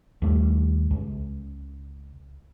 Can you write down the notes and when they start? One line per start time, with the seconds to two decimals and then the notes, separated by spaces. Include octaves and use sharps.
0.22 D#2 G3 A3
0.91 C#2